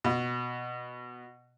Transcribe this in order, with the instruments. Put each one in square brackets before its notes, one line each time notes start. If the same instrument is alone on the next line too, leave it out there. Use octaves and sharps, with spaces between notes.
[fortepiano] B2